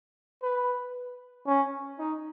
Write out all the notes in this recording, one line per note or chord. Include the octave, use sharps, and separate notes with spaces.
B4
C#4
D#4